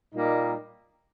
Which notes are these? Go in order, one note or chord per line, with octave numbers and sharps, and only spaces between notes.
A#2 G3 A#3 D#4